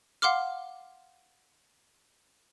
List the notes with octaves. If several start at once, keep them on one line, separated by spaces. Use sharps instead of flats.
F5 F#5 C6 D6 F6